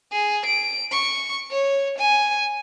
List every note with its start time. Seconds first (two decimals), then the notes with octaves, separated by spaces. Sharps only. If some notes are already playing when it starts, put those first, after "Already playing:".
0.12 G#4
0.46 D7
0.91 C#6
1.51 C#5
1.98 G#5